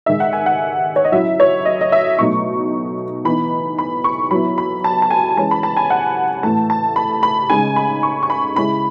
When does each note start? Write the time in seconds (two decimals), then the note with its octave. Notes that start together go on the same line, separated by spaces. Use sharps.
0.06 D#3 G#3 D#4 E5
0.20 F#5
0.33 G#5
0.46 F#5
0.96 C#5
1.04 D#5
1.12 F#3 C#4 E4 E5
1.40 C#5
1.65 D#5
1.81 D#5
1.92 E5
2.19 B2 F#3 A3 D#4 C#6
3.25 E3 B3 D#4 B5
3.79 B5
4.04 C#6
4.31 F#3 B3 E4 B5
4.58 B5
4.84 A5
5.02 A5
5.10 G#5
5.37 E3 G#3 C#4 A5
5.51 B5
5.63 A5
5.77 G#5
5.90 F#5
6.43 A2 E3 A3 A5
6.70 A5
6.96 B5
7.23 B5
7.50 C#3 G#3 D#4 G#5
7.76 B5
8.03 C#6
8.23 C#6
8.30 B5
8.56 C#3 G#3 C#4 E4 B5